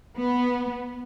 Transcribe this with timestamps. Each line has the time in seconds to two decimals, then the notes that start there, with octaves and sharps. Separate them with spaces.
0.17 B3